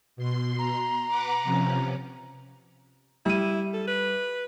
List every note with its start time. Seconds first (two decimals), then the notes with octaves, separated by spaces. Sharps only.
0.16 B2 C6
0.58 A#5
1.08 B4 F#5 D6
1.42 C3 F3 C#4
3.26 G3 E4 E5 D#7
3.74 A4
3.88 B4